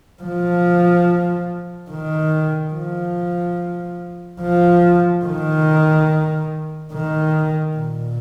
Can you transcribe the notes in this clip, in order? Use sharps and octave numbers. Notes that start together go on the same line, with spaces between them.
F3
D#3
F3
F3
D#3
D#3
A#2